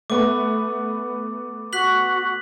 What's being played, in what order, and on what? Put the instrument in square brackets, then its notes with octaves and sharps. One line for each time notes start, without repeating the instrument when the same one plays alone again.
[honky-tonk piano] A3 B3 B4 [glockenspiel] D6
[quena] F#4 [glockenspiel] F#6 B6 F#7